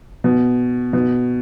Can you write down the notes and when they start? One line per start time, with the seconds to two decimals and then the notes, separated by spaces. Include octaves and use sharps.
0.24 B2
0.93 B2